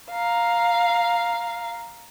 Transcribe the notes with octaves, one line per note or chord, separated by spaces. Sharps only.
F5 A#5